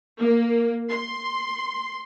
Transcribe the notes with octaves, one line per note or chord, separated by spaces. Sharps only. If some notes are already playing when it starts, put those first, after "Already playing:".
A#3
C6